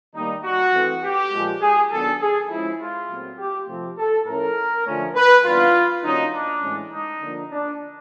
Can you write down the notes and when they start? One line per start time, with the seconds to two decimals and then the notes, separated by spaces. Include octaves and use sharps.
0.14 D#3 G3 A#3 D#4
0.44 F#4
0.73 E3 A3 C4
1.02 G4
1.31 A#2 F3 G#3
1.61 G#4
1.90 D#3 F#3 B3 D4 A4
2.20 G#4
2.50 F3 G#3 C#4 E4
2.80 F4
3.09 A#2 F#3 A3 C4
3.38 G4
3.68 C3 F3 A3 C4
3.97 A4
4.27 A2 F3 A3 C#4 A#4
4.85 D3 F3 A3 C#4
5.15 B4
5.44 C3 E3 G3 B3 D4 F4
6.03 D3 F#3 A#3 C#4 D#4
6.32 D4
6.62 A2 E3 G#3 C#4
6.92 D#4
7.21 D3 F3 A#3 D4
7.51 D4